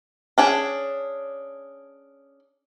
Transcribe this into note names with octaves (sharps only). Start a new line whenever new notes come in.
C#4 D4 G#4